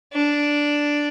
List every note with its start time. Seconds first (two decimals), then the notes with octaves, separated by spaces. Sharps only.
0.13 D4